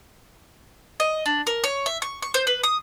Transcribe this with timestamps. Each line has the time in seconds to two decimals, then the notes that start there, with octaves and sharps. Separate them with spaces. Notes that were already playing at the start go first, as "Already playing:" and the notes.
1.00 D#5
1.26 D4
1.47 A#4
1.64 C#5
1.86 E5
2.02 C#6
2.22 C#6
2.34 C5
2.47 B4
2.63 D#6